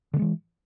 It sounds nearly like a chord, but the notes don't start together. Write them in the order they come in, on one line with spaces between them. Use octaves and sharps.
D3 A3 G#3 E3